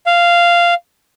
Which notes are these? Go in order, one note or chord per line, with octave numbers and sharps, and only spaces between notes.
F5